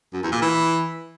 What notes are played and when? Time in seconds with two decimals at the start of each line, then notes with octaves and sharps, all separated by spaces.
0.13 F#2
0.23 E2
0.32 A#2
0.42 E3